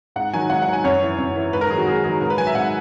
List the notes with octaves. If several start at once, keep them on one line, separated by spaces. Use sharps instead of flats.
G#2 F#5
D#3 F#3 G#5
G#2 F#5
F#5
D#3 F#3
G#5
F#2 C#5
E3
F#2
E3
G#2 B4
A#4
D#3 F#3 G#4
F#4
G#2 G#4
D#3 F#3 G#4
G#2 A#4
B4
F#3 G#5
E5
G#2 F#5